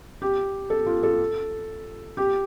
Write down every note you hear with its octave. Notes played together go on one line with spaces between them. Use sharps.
G4
A4
F4
A4
G4